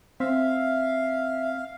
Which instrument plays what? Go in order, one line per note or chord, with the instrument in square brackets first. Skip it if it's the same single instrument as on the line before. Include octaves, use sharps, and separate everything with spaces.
[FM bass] C4 [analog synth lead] E5 [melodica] F5